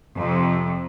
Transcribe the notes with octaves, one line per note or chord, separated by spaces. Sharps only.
F2 C3